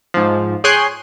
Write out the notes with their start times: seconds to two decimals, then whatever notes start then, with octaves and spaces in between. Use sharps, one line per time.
0.14 G#2 F3
0.64 G#4 C#5 G5 G#5 C6 F#6